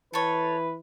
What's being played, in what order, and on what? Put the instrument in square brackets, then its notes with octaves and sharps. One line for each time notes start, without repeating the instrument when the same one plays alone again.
[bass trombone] E3 [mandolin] A4 C#5 [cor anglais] B4